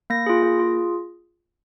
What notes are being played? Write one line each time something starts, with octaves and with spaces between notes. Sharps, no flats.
A#3 A#6
F4 G#4
A#3
F4 G#4